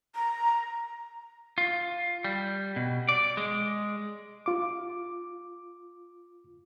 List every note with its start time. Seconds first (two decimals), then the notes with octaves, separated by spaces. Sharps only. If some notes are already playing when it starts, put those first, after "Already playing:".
0.15 A#5
1.58 F4
2.24 G3
2.76 B2
3.09 D5
3.37 G#3
4.46 F4 D6